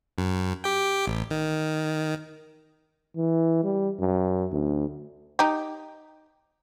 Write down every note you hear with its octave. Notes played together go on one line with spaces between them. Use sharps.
F#2
G4 G5
A1
D#3
E3
G3
F#2
D2
D#4 G4